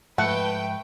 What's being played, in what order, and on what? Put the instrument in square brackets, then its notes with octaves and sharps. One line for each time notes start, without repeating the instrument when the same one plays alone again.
[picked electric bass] G#2 F3 G#3 [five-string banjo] A3 [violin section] B4 G5 [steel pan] F#5